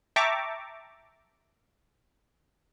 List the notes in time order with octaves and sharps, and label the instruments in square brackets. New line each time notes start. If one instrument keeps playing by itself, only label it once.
[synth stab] E5 G5 A5 A#5 C#6 D6